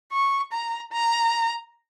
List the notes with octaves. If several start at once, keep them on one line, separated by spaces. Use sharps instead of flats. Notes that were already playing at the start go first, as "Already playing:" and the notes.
C#6
A#5
A#5